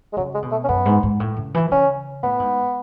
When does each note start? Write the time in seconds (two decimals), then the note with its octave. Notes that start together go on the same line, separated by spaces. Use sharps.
0.13 G#3
0.17 C#3 F#3
0.34 G#3
0.42 B2
0.51 A3
0.64 C#4
0.68 F#2 B3
0.85 G#2
1.03 G#2
1.20 A2
1.37 C#3
1.54 E3
1.71 C#3 C#4
2.23 A2 B3
2.40 G#2